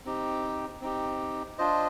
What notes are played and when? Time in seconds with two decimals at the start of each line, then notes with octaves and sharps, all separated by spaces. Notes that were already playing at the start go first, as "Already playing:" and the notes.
0.05 C4 D#4 G4
0.81 C4 D#4 G4
1.58 D4 F4 C5 D#5